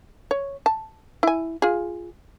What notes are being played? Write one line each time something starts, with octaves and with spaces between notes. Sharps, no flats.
C#5
A5
E4 G#5
F4 G#4